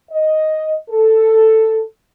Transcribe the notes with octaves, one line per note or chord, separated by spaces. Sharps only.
D#5
A4